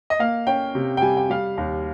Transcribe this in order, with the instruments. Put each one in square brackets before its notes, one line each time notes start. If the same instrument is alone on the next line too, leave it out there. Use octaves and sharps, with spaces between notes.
[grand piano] D#5
A#3 F5
C#4 G5
C3
G5
G3 G#5
G5
G3 F5
D#2